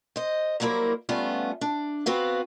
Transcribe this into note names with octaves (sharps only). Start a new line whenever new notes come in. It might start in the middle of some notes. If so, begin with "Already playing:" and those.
C5 D#5
F#3 G3 A#3 E4 A#4 C5
G3 A3 B3 C#4 F4
D4
B3 C4 F#4 B4 F5